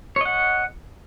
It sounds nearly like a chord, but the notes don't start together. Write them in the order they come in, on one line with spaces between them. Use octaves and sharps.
C#5 D#5 F#5